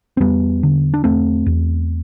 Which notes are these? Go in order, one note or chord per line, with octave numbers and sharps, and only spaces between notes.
C4
E2 G3 B3
D3
D4
E2 A3 C4
E2